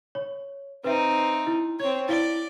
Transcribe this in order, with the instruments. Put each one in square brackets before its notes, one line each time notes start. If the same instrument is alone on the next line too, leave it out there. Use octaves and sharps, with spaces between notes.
[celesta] C#5
[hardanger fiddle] C4 D#4 [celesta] B4 E5
[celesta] E4
[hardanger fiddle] C4 C#5 [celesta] G#6
[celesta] E4 F5 G7 [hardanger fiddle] D5